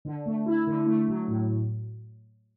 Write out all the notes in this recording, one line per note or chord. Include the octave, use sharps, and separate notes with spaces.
D3
A3
E4
D3
A3
F#3
A2